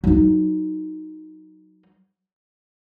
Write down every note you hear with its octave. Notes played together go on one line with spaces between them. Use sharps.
F#3 D#4